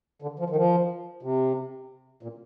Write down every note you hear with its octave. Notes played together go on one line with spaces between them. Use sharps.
D3
F3
D#3
F3
C3
A#2